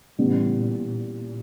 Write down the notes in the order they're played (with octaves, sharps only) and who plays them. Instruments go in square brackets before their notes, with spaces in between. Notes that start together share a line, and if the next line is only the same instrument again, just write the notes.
[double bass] A2 [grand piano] C#3 E3 G3 B3
[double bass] A#2
A#2